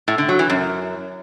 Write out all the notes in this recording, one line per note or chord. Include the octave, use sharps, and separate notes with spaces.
A2
D3
F#3
E3
F#2